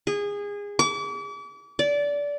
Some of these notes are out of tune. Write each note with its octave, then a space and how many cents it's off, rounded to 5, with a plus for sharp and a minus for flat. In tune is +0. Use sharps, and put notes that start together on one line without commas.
G#4 -25
D6 -40
D5 -20